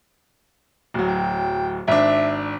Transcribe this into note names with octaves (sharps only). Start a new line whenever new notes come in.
D1 F#3
G5
G#1 D4 E5